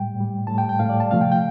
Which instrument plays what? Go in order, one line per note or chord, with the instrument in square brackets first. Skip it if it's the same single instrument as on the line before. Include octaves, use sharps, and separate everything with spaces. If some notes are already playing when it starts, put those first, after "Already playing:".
Already playing: [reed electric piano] A2 G3 G5
A2
G3
A2 G3 A5
G5
G5
A2 G3 F5
D5
A5
C3 F3 A3 F5
G5
G5